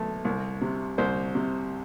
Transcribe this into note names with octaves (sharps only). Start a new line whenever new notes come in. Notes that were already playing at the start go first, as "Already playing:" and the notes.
Already playing: B1 A3
C2
C3
C2 C5
C3